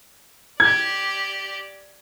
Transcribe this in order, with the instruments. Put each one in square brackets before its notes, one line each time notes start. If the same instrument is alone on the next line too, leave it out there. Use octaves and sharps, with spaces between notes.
[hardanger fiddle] G4 D5 [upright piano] G#6